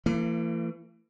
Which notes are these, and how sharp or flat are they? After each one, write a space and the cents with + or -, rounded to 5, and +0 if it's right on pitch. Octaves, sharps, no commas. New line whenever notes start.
E3 +35 A#3 -45